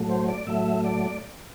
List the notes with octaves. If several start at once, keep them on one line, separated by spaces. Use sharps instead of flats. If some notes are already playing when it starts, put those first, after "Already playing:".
Already playing: A2 F#3 A3
C5
D5
A2 F#3 A3 E5
D5